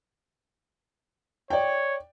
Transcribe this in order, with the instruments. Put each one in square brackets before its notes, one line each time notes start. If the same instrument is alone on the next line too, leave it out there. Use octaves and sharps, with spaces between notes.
[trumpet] C#5 [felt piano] D5 G5